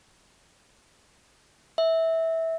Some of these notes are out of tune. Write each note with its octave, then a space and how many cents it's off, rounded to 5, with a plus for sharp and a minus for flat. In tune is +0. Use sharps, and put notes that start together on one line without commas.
E5 -15